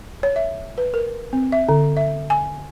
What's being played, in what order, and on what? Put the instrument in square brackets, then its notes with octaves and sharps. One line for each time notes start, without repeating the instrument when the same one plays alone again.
[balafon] C#5
E5
B4
A#4
C4
E5
D3
E5
G#5